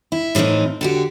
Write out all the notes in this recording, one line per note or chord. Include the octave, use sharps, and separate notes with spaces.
E4
A2 E3 F3 C4 D#4
D3 F#4 G4